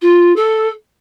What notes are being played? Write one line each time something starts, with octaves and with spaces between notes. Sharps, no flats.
F4
A4